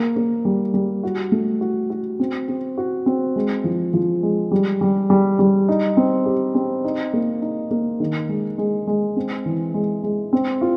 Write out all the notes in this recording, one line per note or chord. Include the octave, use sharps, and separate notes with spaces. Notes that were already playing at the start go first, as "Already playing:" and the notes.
Already playing: A#3
A#3
G3
G3
F#4
A3
F#4
F#4
C4
C4
F#4
C4
G#3
F3
F3
G#3
G3
G3
G3
G3
D#4
C4
G4
C4
D#4
A#3
D#4
A#3
D#3
G#3
G#3
G#3
C4
E3
G#3
G#3
C4
F4